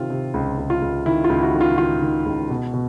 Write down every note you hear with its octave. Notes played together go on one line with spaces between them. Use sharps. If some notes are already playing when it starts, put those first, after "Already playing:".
Already playing: C3 D#3 F4
C3
C#2
C#2
F4
C#2
D#3 E4
F4
C#2
E4 F#4
D#3
F4
D#3 F4
D#3
C#2
B2
B2